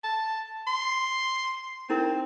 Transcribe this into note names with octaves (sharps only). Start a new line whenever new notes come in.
A5
C6
C4 D#4 E4 A#4